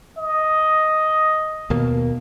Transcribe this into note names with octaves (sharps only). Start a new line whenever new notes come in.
D#5
D#2 B2 A#3